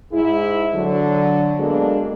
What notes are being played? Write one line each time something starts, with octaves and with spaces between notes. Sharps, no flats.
G#2 E4 G#4
D3 F#3
G#3 A#3 B3 D4 F#4 A4